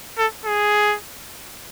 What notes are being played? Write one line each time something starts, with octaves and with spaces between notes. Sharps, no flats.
A4
G#4